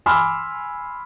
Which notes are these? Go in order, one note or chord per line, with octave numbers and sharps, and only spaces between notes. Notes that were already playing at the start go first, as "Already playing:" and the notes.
G#5 B5 C6 D6 E6 F6